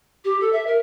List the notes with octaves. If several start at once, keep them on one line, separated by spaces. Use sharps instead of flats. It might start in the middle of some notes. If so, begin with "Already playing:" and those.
G4
A4
E5
A#4